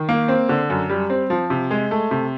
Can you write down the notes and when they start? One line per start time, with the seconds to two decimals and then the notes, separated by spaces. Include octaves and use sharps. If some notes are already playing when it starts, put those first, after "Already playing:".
Already playing: D#3
0.09 A#3
0.28 C4
0.49 D3
0.70 F#2
0.90 G3
1.10 C4
1.30 F3
1.50 C3
1.71 G#3
1.91 A3
2.11 C3